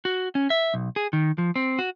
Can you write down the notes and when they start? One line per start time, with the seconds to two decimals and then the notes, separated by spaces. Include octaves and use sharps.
0.05 F#4
0.35 C#4
0.50 E5
0.74 B1
0.96 G#4
1.13 D#3
1.38 F3
1.56 C4
1.79 F#4